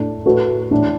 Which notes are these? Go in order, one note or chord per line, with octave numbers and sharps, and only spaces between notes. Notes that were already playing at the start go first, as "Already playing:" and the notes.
Already playing: A2 A3 D4
A2 A3 F#4 B4
A2 E3 D4